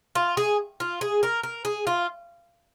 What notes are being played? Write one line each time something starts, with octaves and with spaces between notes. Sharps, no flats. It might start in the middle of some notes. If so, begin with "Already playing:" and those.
F4
G#4
F4
G#4
A#4
A#4
G#4
F4